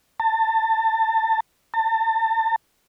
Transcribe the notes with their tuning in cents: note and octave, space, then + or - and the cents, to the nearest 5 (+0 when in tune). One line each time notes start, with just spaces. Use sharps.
A5 +25
A5 +35